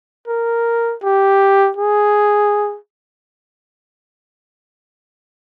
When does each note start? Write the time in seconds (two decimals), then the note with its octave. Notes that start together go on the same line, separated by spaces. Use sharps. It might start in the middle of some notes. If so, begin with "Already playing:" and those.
0.28 A#4
1.03 G4
1.77 G#4